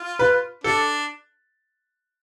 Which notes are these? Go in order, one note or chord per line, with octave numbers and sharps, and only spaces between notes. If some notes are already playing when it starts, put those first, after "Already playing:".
Already playing: F4
B4
D4 A4